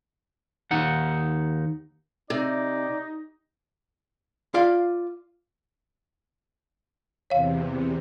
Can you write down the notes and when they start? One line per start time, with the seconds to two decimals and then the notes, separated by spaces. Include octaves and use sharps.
0.71 D#2 D#4 F#5
2.30 C3 D#4 D5
4.54 F4 D5 F5
7.30 E2 C3 C#5 F5